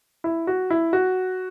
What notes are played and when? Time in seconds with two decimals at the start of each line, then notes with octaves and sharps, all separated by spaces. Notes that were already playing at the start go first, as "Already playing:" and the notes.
0.24 E4
0.47 F#4
0.70 E4
0.93 F#4